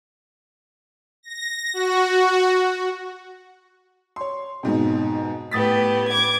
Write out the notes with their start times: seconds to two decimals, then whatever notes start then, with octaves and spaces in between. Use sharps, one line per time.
1.23 A#6
1.74 F#4
4.16 C#5 C6
4.63 F2 G#2 B2
5.51 A2 B3 G4 D#6 A6 B6
6.09 D6 G#6